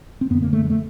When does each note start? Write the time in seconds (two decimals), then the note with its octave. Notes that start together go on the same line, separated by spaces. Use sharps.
0.21 C4
0.30 F#2 B3
0.34 D3
0.42 A#3
0.53 A3
0.65 G#3
0.70 A3